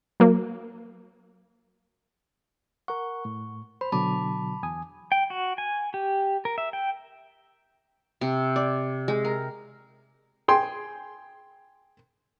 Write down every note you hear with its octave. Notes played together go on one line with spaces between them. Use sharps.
F#3 A#3
A#4 F#5 C#6
A2
C5 B5
B2 D3 F#3 A5 B5 D6
E2 G#5 D#6
G5
F#4
G#5
G4
A#4
E5
G5
C3
D5
G#3
A#4
G#4 G5 C6